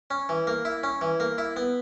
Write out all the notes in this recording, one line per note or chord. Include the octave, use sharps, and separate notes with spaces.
C#4
E3
A#3
E4
C#4
E3
A#3
E4
B3